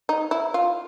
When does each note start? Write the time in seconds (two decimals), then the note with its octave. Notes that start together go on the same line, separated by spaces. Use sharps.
0.09 D#4
0.31 E4
0.54 F4